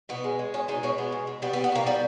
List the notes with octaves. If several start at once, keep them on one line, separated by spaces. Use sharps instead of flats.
B2 B3
G#3
G#3
B2 C#4
G#3 D#4
B2 C#4
G#3 B3
B2
B2
G3 B3
B3
G3
B3
B2 A#3
G3 B3